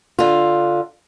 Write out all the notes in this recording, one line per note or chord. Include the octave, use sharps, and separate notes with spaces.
D3 F4